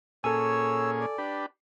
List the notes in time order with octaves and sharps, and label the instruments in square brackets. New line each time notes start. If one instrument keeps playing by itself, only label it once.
[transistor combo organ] A#2 C#4 G#4 [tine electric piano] A4 G#5 [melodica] C#5 E6
[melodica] D5
[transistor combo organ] D4 G4 B4